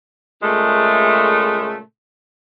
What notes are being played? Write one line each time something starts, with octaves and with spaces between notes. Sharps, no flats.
A#2 C#3 G#3 A3